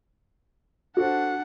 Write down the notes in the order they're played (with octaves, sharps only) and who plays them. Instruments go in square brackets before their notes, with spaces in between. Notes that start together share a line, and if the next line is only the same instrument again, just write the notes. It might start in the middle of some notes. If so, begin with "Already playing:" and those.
[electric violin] D4 F#5 [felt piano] F#4 A4 C5